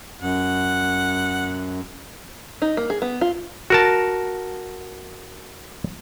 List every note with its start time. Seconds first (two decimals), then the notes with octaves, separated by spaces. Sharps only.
0.21 F#2 F#5
2.62 D#4
2.77 A#3
2.90 G#4
3.02 B3
3.21 F4
3.70 F#4 A#4 A5